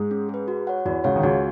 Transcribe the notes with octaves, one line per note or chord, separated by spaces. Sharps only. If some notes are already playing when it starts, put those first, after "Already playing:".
Already playing: G#2 G#3
C#4
G#4 B4
F#4
C#5 F#5
E2 E3 F#4
C#2 C#3 C#5 F#5
D#3
C#2 C#3 F#4